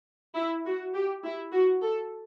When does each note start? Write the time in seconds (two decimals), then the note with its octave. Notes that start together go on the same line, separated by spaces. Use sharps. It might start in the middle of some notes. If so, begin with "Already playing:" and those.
0.36 E4
0.65 F#4
0.94 G4
1.24 E4
1.52 F#4
1.82 A4